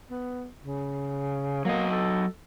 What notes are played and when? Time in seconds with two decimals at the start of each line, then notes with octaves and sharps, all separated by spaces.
0.11 B3
0.64 C#3
1.65 F#3 A#3 D#5
1.91 A4